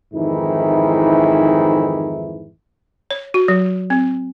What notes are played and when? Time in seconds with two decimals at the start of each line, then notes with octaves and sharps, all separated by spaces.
0.13 F2 G#2 D#3 E3 D#4 E4
3.11 C#5
3.34 F#4
3.48 F#3
3.90 C4